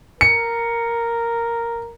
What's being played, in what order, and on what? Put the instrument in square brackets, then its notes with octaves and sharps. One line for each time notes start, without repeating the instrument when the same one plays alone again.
[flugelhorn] A#4 [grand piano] C#7